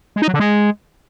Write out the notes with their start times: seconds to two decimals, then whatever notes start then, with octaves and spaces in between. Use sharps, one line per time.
0.16 G#3
0.22 D#4
0.28 F#3
0.34 D3
0.40 G#3